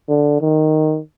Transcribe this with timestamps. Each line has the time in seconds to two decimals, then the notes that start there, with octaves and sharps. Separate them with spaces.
0.09 D3
0.41 D#3